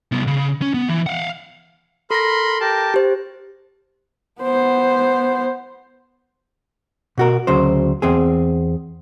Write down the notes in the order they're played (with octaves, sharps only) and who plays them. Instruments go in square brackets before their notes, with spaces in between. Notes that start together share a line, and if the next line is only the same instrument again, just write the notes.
[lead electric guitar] C2 B3
C#3
C#4
B3
E3
F5 F#5
[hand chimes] A4 A#6 [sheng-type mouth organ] A#4 B5 C6
[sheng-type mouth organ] G4 A#4 A5
[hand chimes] G4 C5
[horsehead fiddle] B3 C5
[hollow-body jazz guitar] B2 F#4 A#4
D2 C#3 F#3 C5
E2 C4 G#4